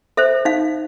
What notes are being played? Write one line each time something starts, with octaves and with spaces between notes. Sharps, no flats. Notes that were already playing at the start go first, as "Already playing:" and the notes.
A4 C5 E5
D#4 F5